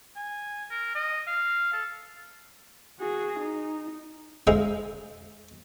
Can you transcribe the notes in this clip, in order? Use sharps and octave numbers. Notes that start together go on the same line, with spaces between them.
G#5
A#4
D#5
F5
A4
F#4 G#4
D#4
G#3 D#4 G#4 C5 E5 F5